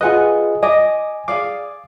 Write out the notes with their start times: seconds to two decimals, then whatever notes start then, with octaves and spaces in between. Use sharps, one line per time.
0.01 F4 G#4 B4 D#5 F#5 G#5
0.63 D#5 G#5 D6
1.28 G#4 D5 F5 D6